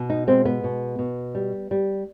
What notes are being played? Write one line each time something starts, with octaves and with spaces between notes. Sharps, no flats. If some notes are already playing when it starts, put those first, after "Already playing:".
Already playing: B2
D#4
G#3 C4
B3
B2
B2
G3
G3